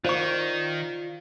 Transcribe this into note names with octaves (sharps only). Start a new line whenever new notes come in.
D#3 F4 C5 D5 F5 C#6